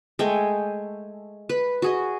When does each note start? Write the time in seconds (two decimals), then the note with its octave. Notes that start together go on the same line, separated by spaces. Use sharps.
0.19 G#3 A3 G5 G#5
1.49 B4
1.82 F#4 G#4 D#5